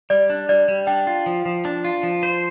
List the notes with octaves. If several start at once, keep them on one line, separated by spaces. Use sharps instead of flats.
G3 D5
D4
G3 D5
G3
D4 G5
F4
F3
F3
D4
F4
F3
C5